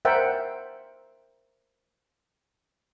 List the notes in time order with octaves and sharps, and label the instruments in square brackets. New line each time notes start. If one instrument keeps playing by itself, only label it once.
[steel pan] A#4 C5 E5 F#5 G5